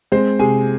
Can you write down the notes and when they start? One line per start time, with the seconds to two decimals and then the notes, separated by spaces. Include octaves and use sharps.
0.12 G#3 C4 C5
0.39 C3 G#4 G#5